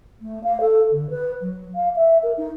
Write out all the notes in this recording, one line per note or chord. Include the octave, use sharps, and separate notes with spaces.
A3
F5
A4
D3
B4
F#3
F5
E5
A#4
D#4